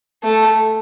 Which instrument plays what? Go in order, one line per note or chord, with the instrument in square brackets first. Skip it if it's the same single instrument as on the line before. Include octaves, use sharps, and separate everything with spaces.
[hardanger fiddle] A3